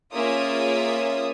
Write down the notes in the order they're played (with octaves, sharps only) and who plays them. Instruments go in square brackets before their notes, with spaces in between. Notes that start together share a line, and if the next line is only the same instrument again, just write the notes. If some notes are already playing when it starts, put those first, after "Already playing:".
[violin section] A#3 C#4 F4 G#4 E5 D#6